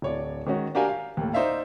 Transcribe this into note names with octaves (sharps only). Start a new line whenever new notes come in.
D1 C#5 D5
D#3 G#3 C#4 F#4
D4 F#4 G4 A#4 F5 G#5
F5
D#2 A2
D#4 C5 D5 E5 F5